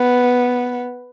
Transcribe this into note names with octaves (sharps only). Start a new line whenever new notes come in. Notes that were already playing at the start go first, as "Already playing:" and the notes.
Already playing: B3